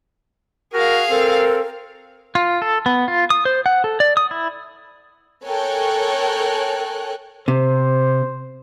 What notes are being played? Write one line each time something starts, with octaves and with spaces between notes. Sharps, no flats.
F#4 G#4 A#4 F5
C4 A4 A#4
F4
A4
B3
F4
D#6
C5
F#5
A4
D5
D#6
E4
A4 A#4 C#5 G5 G#5 F#6
C3 C5